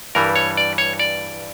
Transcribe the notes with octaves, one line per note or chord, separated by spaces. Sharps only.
G2 E3 G3 A#4
C#5
D5
C#5
D5